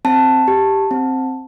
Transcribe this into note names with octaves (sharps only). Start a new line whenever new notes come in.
C4 A5
G4
C4